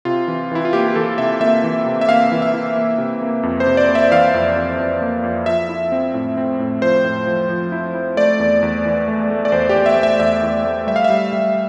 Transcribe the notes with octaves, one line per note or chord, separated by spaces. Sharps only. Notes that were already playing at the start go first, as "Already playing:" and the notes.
C3 F4
E3
E3 E4
F4
A#3 G4
G4
E3 A4
C3 E5
A#3 E5
E3
C3
E5
A#3 F5
E3
E5
E4
A#3
C3
A#3
F2
C5
C3
D5
A#3
E5
E3 F5
F2
F2
F2
A#3
F2
F3 E5
E4
C4
A2
C4
A2
F3 C5
A2
F3
F3
E4
E4
A3 D5
E2
E2
E3
A3
A3
D5
E2 C5
G4
E2
E5
A3
E5
E2 E5
E2
A3
G3 E5
F5
E5
G3
G3